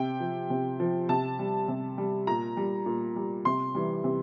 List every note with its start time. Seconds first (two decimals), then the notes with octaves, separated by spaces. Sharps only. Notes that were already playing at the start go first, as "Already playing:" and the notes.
Already playing: C3 G5
0.20 F3
0.50 C3
0.80 F3
1.09 C3 A5
1.39 G3
1.68 C3
1.98 G3
2.27 A#2 A#5
2.57 G3
2.86 A#2
3.16 G3
3.45 C3 C6
3.75 E3 G3
4.04 C3